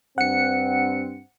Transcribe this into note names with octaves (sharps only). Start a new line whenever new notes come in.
G2 C4 F#5 C#7